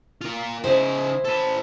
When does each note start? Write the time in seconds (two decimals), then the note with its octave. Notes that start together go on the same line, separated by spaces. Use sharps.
0.21 F4 A#4
0.64 C#3 D#4 E4 C5
1.25 A4 B4